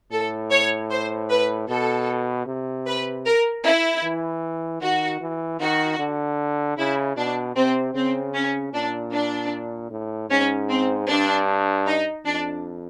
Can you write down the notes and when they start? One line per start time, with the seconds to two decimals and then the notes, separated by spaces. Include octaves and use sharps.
0.12 A2 A4
0.50 C#5
0.90 C5
1.29 B4
1.69 B2 A4
2.47 C3
2.86 B4
3.25 A#4
3.64 E4
4.04 E3
4.81 D#3 F#4
5.21 E3
5.60 D#3 F#4
5.99 D3
6.77 C#3 E4
7.17 B2 D4
7.56 C3 C4
7.95 C#3 C4
8.34 C#4
8.73 A#2 D4
9.12 D4
9.91 A2
10.30 G#2 C#4
10.69 C4
11.08 G2 D4
11.87 D#4
12.25 F2 D4